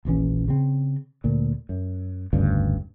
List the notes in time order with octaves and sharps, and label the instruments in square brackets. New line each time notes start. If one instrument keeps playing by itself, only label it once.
[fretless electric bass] D#1 A#1 E3 C#4
C#3 C4
D2 A#2
F#2
F1 D2 G2 C#3